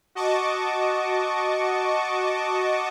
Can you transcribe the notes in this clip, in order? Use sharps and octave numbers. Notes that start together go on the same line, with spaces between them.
F#4 D#5 A5 C#6 D6